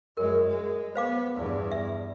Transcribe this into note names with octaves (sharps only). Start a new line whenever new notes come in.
F#2 G#3 A#4
G#3
B3 C5 F5 D6
E2 G2
E5